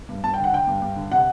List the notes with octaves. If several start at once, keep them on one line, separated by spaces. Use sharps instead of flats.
G2
G2 A5
G5
D3
F#5
D3 G5
G2
G2
D3
C3 F#5